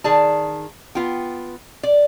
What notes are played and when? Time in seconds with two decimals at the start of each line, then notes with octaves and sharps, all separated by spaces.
0.04 D#3 G#4 D5 A5
0.95 B3 F4 G5
1.83 D5